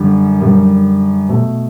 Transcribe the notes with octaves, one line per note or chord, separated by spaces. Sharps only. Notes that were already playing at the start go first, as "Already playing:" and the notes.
Already playing: F#2 D3 G3
F#2 D3 G3
B2 A3